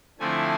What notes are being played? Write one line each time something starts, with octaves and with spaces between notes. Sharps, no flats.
D3 F3 A3 C4 E4 G#5